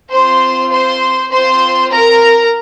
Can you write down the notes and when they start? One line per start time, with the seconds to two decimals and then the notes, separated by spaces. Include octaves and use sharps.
0.10 C4 F4 C5 C6
0.70 C5 C6
1.31 C4 F4 C5 C6
1.91 A#4 A#5